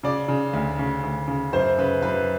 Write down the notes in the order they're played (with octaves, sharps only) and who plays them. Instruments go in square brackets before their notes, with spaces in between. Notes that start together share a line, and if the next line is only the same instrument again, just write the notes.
[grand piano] C#3 D5
C#3
D2
C#3
D2
C#3
F#2 C5
C#3 B4
F#2 B4